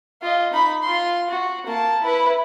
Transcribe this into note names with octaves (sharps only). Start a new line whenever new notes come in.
F4 D#5
D#4 B5
F4 C6
F#4
A#3 A5
E4 B4